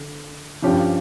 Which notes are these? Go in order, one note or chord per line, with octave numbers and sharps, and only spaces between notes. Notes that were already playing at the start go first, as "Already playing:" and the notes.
Already playing: D3
G2 F3 C#4 G4